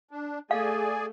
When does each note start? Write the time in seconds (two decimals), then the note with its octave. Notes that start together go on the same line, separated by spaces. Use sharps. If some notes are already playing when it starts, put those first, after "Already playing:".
0.11 D4
0.51 A3 G#4 D5 F5 G#5